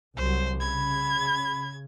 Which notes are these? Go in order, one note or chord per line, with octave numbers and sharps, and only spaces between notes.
C2 F#3 C5
C#3 B5 G#6